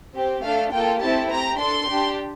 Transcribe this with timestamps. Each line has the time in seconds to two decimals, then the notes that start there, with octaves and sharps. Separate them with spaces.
0.16 C4 G4
0.43 A3 D4 A4 F5
0.72 A#3 F4 A4 G5
1.01 A3 C4 E4 G4 A5
1.31 C4 G4 A#5
1.58 D4 A4 C6
1.88 D4 G4